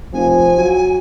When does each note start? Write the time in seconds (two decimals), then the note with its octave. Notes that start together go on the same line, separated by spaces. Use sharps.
0.13 F1 F3 G#5
0.57 F#3